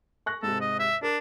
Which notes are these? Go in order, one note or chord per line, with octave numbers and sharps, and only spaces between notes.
C#6 F#6 A#6
G#2 C3 A4
D#5
E5
D4 A#4